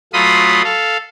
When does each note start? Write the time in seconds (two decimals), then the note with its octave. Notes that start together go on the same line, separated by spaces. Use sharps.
0.13 F#3 A3 F4 B5 C6 D#6
0.64 A4 F5